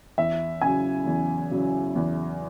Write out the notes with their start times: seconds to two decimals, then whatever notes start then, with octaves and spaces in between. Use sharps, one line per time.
0.18 E2 E5
0.61 C#3 F#3 G#5
1.06 E2
1.51 C#3 F#3
1.96 E2